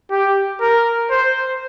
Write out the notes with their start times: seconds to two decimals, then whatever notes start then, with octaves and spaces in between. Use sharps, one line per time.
0.11 G4
0.61 A#4
1.11 C5